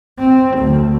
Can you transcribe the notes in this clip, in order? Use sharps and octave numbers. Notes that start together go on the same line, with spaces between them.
C4
D2